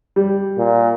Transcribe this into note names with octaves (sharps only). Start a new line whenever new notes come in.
G3
A#2